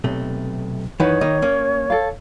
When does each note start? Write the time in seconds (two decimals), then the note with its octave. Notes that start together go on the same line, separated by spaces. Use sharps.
0.04 B1 C3 A3
1.00 F#2 D#3 E3 D#4 B4 C#5 F#5
1.21 D#3 A#3 D#5
1.42 A#3 C#4
1.90 A4 F5